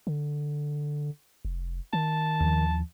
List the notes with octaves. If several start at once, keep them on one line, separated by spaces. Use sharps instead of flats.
D3
F1
D#3 A5
D#2 F3